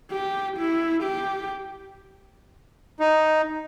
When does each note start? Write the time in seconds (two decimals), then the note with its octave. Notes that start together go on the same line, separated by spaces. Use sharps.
0.11 G4
0.57 E4
1.03 G4
3.00 D#4